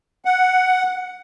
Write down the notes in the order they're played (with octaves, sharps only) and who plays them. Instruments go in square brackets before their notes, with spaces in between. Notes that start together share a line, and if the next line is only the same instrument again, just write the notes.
[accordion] F#5